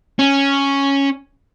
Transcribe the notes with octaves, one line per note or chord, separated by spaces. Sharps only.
C#4